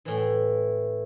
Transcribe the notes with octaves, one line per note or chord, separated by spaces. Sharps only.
A2 E3